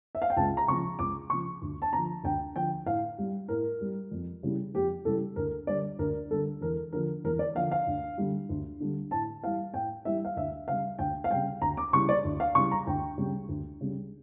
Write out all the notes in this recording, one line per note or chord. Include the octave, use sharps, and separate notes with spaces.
E5
F5
G5
C#2 A5
A#5
C#3 F3 C#6
C#2 D6
C#3 F3 C#6
D2
A5
D3 A#5
F3
D2 G5
D3 F3 G5
A2 F5
G3
A2 A#4
G3
F2
C#3 E3 G3
F2 G4
C#3 E3 G3 A4
D2 A#4
D3 G3 D5
D2 A#4
D3 G3 A4
E2 A#4
D3 F3 A#4
E2 A#4
D5
D3 F3 F5
F5
D2
D3 G3
D2
D3 G3
A2 A5
E3 G3 F5
A2 G5
E3 G3 E5
F5
D2 E5
C#3 G3 F5
D2 G5
F5
C#3 G3 G5
D2 A#5
D6
C#3 E3 G3 C#6
D5
D2
F5
C#3 E3 G3 C#6
A#5
D2 G5
C#3 G3
D2
C#3 G3